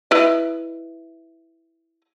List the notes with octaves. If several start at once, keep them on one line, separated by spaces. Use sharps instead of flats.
E4 B4 D#5